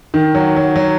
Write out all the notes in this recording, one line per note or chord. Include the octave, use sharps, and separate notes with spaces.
D#3
F#3
F#3
F#3